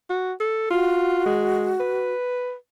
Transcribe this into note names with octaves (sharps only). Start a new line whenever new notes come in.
F#4
A4
F4 F#4
G#3
B4